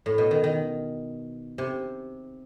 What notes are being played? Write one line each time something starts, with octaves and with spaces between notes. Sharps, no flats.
A2
B2
D#3
D#3
C3